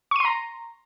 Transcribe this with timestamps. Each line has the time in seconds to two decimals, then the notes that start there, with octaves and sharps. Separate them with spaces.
0.11 C#6
0.16 D#7
0.20 C6
0.25 A#5